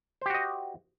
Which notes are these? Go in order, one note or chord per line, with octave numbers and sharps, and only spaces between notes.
F#4 G4 C5 D#5